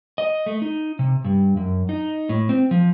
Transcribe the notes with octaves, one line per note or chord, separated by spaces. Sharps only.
D#5
A3
D#4
C3
G2
F#2
D#4
A2
C4
F3